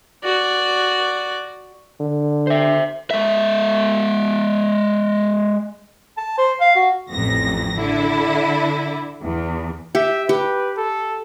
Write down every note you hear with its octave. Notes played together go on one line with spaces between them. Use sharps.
F#4 D5
D3
C5 E5
G#3 E5
A5
C5
F5
F#4
A1 F2 A#6
D3 E4
E2
G4 E5
G4 B4
A4